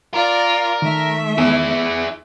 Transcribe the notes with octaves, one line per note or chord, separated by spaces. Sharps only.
F4 A#4 D5
D#3 A3 E5
E2 E4 G#4